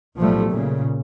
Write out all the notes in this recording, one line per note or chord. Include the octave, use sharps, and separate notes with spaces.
B1 A2 F3 G3 A3
A#2 C#3